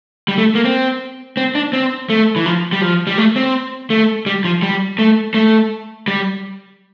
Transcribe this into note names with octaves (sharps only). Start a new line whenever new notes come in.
G3
A3
A#3
C4
C4
D4
C4
A3
E3
F3
G3
F3
G3
A3
C4
A3
G3
F3
G3
A3
A3
G3